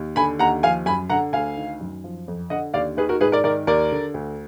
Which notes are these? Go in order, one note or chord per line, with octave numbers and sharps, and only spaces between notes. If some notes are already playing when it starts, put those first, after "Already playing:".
Already playing: D#2
D3 G#5 B5
D#2 F#5 A#5
F3 F5 G#5
F#2 G#5 B5
D3 F#5 A#5
D2 F5 G#5
D#3
F#2
F3
F2
D3 D#5 F#5
D#2 D5 F5
D#3 G#4 B4
F#4 A#4
G#2 G#4 B4
A#4 D5
D#3 A#4 D5
D#2 A#4 D5
D3
D2